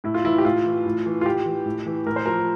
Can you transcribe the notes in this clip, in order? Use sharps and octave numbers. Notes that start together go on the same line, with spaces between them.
A2 E4
F4
E3 E4
G4
A2 F4
E3
A2
E3
F4
A2 G4
E3
A2
E3
A2 A#4
C5
F3 A#4